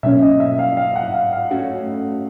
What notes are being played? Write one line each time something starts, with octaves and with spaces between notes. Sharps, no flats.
B2 F#3 A#3 C#4 E5
D#5
E5
F5
F5
F#5
F5
F5
A3 C#4 F#4